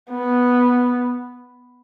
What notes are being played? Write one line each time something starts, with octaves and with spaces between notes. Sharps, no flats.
B3